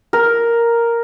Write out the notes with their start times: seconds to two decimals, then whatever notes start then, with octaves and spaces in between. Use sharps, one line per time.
0.13 A#4